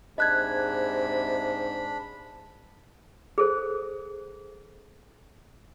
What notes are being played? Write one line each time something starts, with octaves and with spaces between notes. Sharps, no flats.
G#2 C3 D4 D#5 B5 F#6 G#6
G#4 A4 C5